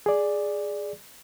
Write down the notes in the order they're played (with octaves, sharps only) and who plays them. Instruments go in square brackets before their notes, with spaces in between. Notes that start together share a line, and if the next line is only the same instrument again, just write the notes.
[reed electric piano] G#4 D5